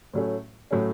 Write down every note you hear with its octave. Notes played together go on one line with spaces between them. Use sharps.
A2 F#3 A3 C#4
A2 F#3 A3 C#4